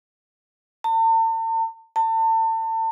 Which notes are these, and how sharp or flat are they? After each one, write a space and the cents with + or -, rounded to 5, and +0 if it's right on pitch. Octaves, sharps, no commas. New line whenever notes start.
A5 +45
A5 +35